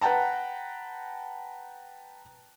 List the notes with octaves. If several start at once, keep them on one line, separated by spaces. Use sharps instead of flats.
B4 F#5 G5 A5 A#5